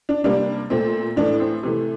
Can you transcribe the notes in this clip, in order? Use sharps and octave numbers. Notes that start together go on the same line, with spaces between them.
D4
C3 G3 A#3 D4
A#2 A3 C4
A2 E3 A3 D4
C4
C3 E3 A3